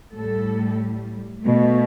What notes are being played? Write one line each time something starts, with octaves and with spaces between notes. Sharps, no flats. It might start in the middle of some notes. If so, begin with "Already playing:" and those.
A2 G3 A4
B2 A3